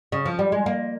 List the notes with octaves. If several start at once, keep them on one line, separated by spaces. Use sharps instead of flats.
C#3
F3
G3
G#3
A#3